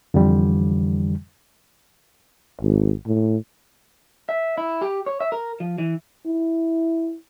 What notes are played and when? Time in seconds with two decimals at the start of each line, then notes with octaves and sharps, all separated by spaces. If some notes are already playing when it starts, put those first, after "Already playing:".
0.14 F2 D3 E3 G3
2.61 G#1
3.06 A2
4.29 E5
4.58 E4
4.82 G4
5.06 C#5
5.20 E5
5.32 A#4
5.60 F3
5.78 E3
6.26 E4